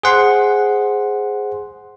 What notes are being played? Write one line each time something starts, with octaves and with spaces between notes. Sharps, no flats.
G#4 C5 F#5 C6